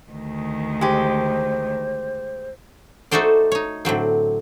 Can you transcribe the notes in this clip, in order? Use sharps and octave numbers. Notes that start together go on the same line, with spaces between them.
D2 D#3
G#3 G4 C5
A3 D#4 F#4 A4 C5 D5
D#4 C#5
A2 D3 F#3 C4